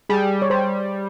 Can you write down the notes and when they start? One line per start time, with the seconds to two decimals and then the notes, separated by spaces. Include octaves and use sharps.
0.10 G3 G#4
0.42 C#5
0.50 G3 C5